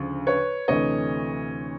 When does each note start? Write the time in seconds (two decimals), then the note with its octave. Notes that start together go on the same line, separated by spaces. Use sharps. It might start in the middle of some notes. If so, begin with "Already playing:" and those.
Already playing: D2 C#3 F3
0.27 B4 C#5
0.68 D2 C3 E3 A3 C#5 D#5